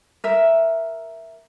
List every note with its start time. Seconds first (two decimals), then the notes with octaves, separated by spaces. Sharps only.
0.24 A#4 E5